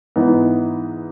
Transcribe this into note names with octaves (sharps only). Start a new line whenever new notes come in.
G#2 E3 B3 D#4